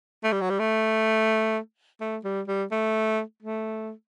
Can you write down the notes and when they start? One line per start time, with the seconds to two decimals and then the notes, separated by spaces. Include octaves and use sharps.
0.24 A3
0.32 G3
0.41 F#3
0.50 G3
0.59 A3
2.01 A3
2.24 G3
2.47 G3
2.71 A3
3.42 A3